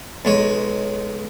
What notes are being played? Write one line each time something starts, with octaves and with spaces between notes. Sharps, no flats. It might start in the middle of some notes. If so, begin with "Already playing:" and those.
B1 G#3 C#5